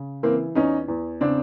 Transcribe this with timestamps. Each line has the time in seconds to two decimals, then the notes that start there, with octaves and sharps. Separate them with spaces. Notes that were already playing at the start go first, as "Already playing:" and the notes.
Already playing: C#3
0.23 E3 A#3 C4
0.55 E2 C#4 D#4
0.88 E2
1.21 C#3 C4 D4